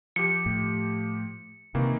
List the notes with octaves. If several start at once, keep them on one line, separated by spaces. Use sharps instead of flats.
F3 G4 C#7
A2
C3 D#3 E3 A#3